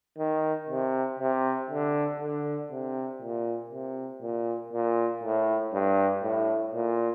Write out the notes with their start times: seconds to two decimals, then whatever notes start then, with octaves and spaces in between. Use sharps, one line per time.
0.19 D#3
0.69 C3
1.19 C3
1.70 D3
2.21 D3
2.71 C3
3.22 A#2
3.72 C3
4.22 A#2
4.73 A#2
5.23 A2
5.74 G2
6.24 A2
6.74 A#2